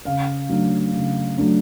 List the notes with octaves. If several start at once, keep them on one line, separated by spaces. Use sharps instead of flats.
C#3 F5
F#3 A3 D4
C#3
F#3 A3 D4